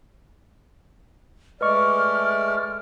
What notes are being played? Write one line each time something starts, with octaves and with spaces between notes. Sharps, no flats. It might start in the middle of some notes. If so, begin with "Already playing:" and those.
G#3 A3 B4 D5 D#5 C#6 F6